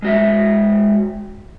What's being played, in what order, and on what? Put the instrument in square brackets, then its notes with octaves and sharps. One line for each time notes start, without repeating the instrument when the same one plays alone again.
[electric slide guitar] G#3 F#4 E5